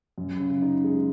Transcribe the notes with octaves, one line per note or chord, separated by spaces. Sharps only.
F#2
C#3
D#4
G#3